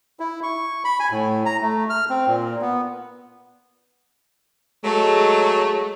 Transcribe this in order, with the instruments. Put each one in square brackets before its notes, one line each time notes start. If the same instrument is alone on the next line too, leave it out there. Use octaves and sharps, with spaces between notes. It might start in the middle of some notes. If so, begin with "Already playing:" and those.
[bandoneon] E4
C#6
B5
G#5
A2
A#5
A3
F6
C4
A#2
B3
[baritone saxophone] F#3 [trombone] G#3 [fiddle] A3